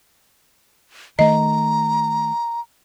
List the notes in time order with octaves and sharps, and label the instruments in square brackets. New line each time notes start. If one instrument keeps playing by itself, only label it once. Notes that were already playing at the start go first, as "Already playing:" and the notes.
[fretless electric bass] D#3 A3 [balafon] D#5 [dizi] A#5